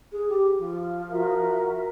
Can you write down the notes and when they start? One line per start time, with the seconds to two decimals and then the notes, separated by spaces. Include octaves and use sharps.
0.12 G#4
0.28 G4
0.58 F3
1.10 F#4 A#4 E5